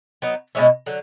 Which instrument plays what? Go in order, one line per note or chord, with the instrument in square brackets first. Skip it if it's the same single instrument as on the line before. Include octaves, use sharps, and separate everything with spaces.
[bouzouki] F#3 B3 D#4
B2 G#3 C#4 E4
D3 F#3